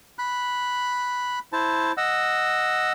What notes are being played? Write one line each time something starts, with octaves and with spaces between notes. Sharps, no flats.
B5 F#6
E4 C5 A5
D#5 F#5 E6